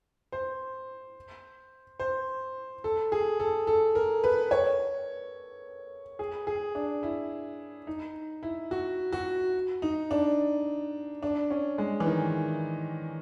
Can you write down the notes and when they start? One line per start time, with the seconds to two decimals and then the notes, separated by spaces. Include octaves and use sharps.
0.32 C5
2.00 C5
2.84 A4
3.12 G#4
3.40 A4
3.67 A4
3.95 A#4
4.24 B4
4.51 C#5
6.19 G#4
6.47 G#4
6.75 D4
7.03 E4
7.87 D#4
8.43 E4
8.71 F#4
9.12 F#4
9.82 D#4
10.11 D4
11.23 D4
11.51 C#4
11.78 G#3
12.00 E3
12.06 D#3